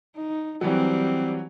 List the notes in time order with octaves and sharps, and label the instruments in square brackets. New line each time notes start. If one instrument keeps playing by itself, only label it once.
[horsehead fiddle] D#4
[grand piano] E3 F#3 [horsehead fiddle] G3 C4